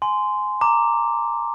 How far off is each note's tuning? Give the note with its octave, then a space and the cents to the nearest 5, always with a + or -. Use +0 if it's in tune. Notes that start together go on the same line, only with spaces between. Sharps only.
G#5 +15 C6 -15
A#5 -10 D6 +0